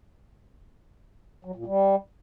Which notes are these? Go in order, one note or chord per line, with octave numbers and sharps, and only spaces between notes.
F#3
A#2
G3